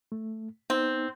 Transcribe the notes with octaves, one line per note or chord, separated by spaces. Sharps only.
A3
B3 C4 D#4